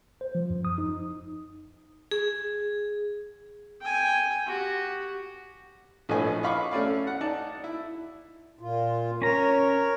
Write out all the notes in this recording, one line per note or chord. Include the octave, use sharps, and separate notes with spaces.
C5
F3
F#2
D#6
D#4
G#4
G5 G#5
F#4 G4
A#1 A2 A3 B4 D#5 G#5
D#5 F5 B5 C#6 D6
A3 C#4 D5 F5
F#5
D#4 D5 A5
E4
A#2 F4
C#4 A#4 C#5 A#5